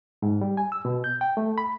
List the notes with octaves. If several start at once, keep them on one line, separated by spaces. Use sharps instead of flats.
G#2
G3
G#5
E6
B2
G6
G5
A3
B5